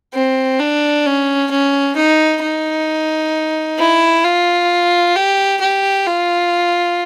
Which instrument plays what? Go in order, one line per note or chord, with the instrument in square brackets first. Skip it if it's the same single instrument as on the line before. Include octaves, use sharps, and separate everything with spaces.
[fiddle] C4
D4
C#4
C#4
D#4
D#4
E4
F4
G4
G4
F4